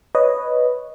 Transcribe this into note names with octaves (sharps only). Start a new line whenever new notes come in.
B4 C#5 D#5